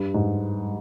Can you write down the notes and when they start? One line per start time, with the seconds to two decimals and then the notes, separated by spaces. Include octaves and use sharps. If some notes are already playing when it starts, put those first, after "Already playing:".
Already playing: G2
0.14 G#2